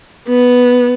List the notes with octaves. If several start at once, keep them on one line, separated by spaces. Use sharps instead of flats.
B3